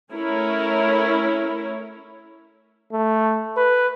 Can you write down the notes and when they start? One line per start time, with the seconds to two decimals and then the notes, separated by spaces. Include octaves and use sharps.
0.12 A3 C#4 E4 A#4 C#5
2.92 A3
3.57 B4